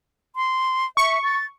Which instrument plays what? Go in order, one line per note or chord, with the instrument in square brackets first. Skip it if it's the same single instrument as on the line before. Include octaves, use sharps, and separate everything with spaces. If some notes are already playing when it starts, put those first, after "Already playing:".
[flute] C6
[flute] E5 [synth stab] C#6
[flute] A6